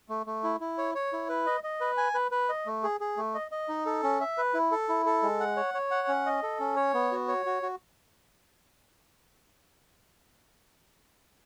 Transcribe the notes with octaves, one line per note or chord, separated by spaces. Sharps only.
A3
A3
E4
E4
C#5
C#5
E4
B4
D#5
D#5
B4
G#5
B4
B4
D#5
A3
G#4
G#4
A3
D#5
D#5
D#4
A4
C#4
E5
B4
E4
A4
E4
A4
G#3
F#5
C#5
C#5
F#5
C#4
D#5
A4
C#4
C#5
B3
F#4
C#5
F#4
F#4